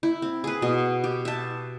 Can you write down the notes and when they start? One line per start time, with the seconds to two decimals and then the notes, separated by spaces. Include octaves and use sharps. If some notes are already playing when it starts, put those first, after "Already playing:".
0.03 E4
0.22 C4
0.44 G#4 B4
0.62 B2
1.04 G4
1.25 E5 A5